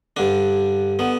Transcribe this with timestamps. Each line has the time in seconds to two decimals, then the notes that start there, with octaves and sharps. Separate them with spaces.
0.17 G2 D3 D4
0.99 D3 B3